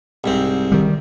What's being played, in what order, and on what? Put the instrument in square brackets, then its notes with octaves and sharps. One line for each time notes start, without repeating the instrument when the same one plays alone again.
[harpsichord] C2 G#2 C4
[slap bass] D#3 G3